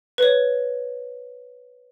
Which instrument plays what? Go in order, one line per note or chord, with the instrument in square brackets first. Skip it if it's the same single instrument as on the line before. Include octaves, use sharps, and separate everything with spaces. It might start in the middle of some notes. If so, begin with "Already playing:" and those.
[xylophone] B4 C#5